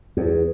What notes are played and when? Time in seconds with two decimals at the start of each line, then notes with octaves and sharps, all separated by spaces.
0.17 E2